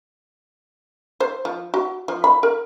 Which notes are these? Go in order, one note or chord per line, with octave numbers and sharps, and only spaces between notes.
C5
F3
F#4
F3
B5
A#4